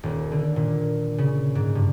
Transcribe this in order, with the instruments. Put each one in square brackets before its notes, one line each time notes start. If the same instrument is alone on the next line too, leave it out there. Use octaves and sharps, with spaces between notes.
[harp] D#1
D3
A#2
C#3
G#2
G2